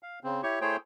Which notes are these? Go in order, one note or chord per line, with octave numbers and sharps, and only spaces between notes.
F5
C#3 C4
E4 G4 C#5 C#6
A3 E4 G#4 C5 C#5 G5